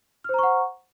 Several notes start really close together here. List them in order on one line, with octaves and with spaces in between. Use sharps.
F6 C5 A#5 C#6 F#5